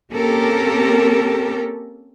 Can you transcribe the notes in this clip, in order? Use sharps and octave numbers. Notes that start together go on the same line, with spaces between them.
A#3 C4 C#4 G4 A4 A#4